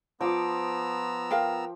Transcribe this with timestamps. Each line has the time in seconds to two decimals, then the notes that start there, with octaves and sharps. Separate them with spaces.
0.21 F3 B3 A#5 D6 E6
1.31 A#4 F5 G5